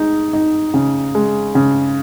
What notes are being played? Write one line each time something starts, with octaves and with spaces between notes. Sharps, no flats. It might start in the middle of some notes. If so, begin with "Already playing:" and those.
Already playing: G#3 D#4
D#4
C#3
G#3
C#3